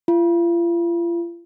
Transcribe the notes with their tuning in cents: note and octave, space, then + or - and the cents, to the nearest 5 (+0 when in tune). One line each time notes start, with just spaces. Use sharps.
F4 -40